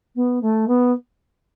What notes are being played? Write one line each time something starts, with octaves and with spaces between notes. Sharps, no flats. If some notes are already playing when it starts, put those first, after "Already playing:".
B3
A3
B3